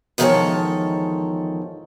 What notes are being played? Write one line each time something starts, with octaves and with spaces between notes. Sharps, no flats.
E2 G#2 D#3 F3 A4 C#5